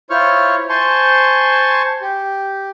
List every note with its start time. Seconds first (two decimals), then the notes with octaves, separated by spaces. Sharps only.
0.10 E4 F4 C5 C#5 C#6 F6
0.69 C5 G#5 A5 C6 C#6
2.01 G4